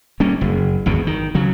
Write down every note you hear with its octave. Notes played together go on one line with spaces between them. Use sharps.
G3 A#3 C#4
F#1
G#1 E2 B2
D#3
C#3 F#3